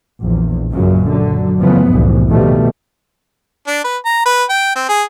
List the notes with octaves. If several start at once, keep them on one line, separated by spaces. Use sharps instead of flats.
A#1 E2
C#2 F#2 A#2 C#3 F#3
D3 F#3
F#2 C#3 E3 F3 A3 B3
F1 C2 F#2 A2 E3
B2 D#3 F3 G3 A3
D4
B4
A#5
B4
G5
C4
G#4